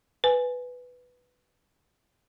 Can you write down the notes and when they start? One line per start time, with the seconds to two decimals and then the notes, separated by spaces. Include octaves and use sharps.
0.24 B4 G#5